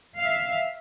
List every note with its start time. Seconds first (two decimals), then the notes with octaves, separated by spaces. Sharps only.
0.18 E5 F5